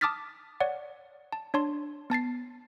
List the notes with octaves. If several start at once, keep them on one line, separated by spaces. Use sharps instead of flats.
A5 D6 D#6 F6 A6 B6
C#5 D5 F#5
A5
D4 C#5 A5 C6
B3 A5 A6 C7